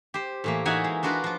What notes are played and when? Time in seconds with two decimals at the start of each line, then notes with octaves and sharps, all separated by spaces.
0.14 G4 C5
0.44 A2 E3 A#3
0.65 E3 D#4 F#4 E5 F#5 G#5
0.84 G#3
1.03 D4 F4 F#4 A#4 B4
1.24 F3 F4